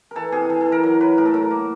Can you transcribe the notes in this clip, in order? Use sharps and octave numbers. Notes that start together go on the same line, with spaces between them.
E3 A4 A#4
C3 G#4
E3 A4
A4
E3
A#4
F#3 A#4
F#3 B4
A2 A#4
A4
F#3 A#4
A#3